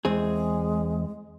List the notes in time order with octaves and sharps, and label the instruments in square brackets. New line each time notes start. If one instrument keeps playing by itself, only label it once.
[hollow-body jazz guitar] E2 C4 G#4 [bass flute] G#3